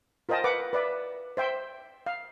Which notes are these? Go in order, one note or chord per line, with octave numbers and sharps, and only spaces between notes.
F4 A#4 C5 D#5 G5 A5
B4 F#5 D6
B4 D5 E5
C5 E5 G5 C6
F5